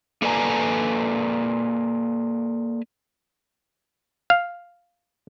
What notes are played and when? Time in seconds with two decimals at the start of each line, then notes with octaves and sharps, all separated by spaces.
0.22 A#3 A4 B4 D5 G#5 A#5
4.30 F5